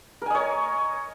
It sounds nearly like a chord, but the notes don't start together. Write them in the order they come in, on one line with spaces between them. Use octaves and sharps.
A#4 G#5 D#5 C#5